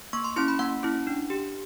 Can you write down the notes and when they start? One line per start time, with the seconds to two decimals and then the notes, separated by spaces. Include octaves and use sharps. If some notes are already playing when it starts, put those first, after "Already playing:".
0.13 A#3 C#6
0.24 C6
0.36 C#4 E4 C6
0.48 B5
0.59 A#3 F#5
0.83 C#4 E4
1.07 D4
1.30 G4